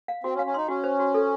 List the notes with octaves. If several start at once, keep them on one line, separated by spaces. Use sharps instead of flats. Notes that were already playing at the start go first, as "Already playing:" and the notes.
F5
C4 F#4
C#4
F5
C#4
D#4 C6
C#4 F#4
C5
F#4
A4